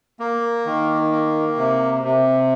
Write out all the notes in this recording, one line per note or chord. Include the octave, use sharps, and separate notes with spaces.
A#3
D#3
A#3
C3
C3